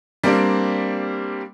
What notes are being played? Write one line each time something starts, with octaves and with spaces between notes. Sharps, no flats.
G3 A#3 C4 D4